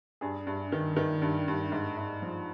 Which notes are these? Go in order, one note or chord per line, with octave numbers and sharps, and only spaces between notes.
G2 G#4
G2
D#3
D#3
G2
G2
G#2
G#2
F3